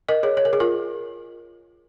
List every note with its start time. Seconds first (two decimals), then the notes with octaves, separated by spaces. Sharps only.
0.09 A#4 D#5
0.23 G#4 C#5
0.37 C#5
0.45 A#4
0.53 G#4
0.60 F4 A#4